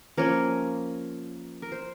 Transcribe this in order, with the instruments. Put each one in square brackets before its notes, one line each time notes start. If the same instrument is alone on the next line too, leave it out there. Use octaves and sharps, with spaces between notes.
[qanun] F3 A#3 C#4 A#4 C#5
A#4
C5